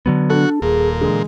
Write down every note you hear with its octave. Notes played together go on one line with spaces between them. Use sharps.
D3 F#3 B3
D4 F#4 A4
D#1 A#2 G#4
D3 E3 G#3